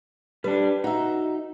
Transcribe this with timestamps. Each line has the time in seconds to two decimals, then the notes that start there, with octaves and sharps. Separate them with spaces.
0.44 G3 D4 B4
0.84 D#4 F#4 E5